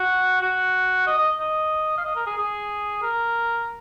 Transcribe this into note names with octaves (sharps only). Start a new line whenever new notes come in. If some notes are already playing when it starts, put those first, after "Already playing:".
Already playing: F#4
F#4
D#5
D#5
D#5
F5
D#5
A#4
G#4
G#4
A#4